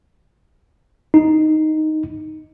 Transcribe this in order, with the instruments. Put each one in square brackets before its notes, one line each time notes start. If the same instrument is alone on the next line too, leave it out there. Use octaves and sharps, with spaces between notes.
[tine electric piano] D#4